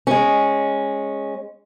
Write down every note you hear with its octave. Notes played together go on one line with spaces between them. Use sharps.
G#3 C#4